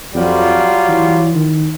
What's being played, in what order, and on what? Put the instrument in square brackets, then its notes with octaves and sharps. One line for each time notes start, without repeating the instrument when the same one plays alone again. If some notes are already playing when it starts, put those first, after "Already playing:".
[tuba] F2 [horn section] F#3 G3 F4
[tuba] E3
D#3